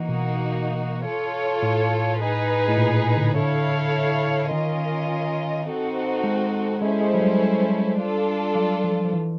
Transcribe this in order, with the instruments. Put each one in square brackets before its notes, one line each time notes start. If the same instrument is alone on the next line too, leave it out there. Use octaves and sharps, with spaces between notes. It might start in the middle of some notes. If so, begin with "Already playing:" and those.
Already playing: [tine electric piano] E3 [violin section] A#3 D#4 F#4
[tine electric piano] B2
[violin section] F4 A4 C#5
[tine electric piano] A2
[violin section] D#4 G#4 B4
[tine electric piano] A2
A#2
D3
[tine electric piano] D3 [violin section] E4 A4 C#5 F5
[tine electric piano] D#3 [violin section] C#4 F4 A#4 D#5
[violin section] C4 D#4 F#4 A4
[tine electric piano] G#3
[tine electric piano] G#3 [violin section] C#4 E4 A4 C5
[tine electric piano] G#3
F#3
G3
[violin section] D4 F4 A4
[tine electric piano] F#3
F3
F3
E3